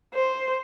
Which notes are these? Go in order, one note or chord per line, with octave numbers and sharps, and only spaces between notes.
C5